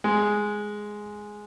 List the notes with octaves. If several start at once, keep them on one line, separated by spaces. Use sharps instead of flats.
G#3